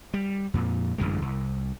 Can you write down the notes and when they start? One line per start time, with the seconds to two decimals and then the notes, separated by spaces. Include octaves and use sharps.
0.14 G3
0.54 F2 A#2
0.98 A1 F#2 D3 G#3
1.22 C2